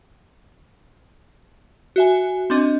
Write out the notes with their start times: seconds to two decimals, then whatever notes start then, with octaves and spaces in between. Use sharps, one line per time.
1.96 F#4 E5 G#5
2.50 C4 D4 D#5